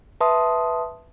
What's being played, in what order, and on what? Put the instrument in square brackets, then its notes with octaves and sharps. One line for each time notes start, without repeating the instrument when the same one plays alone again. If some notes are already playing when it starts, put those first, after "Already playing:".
[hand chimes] B4 E5 A5 C6 D#6